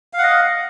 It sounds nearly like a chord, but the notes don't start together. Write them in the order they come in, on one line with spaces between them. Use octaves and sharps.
F5 F#5 D#5